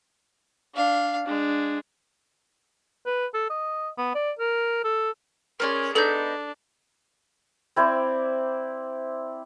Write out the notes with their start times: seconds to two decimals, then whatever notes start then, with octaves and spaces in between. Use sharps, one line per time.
0.75 D4 F5
1.27 G#3 D4
3.06 B4
3.34 A4
3.50 D#5
3.98 B3
4.15 D5
4.39 A#4
4.84 A4
5.60 C#4 G#4 A#4 D5 C6
5.95 B3 D4 D#4 A4 G6 F#7
7.76 C4 E4 C5 D5